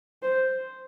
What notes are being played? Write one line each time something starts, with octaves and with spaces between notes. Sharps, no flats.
C5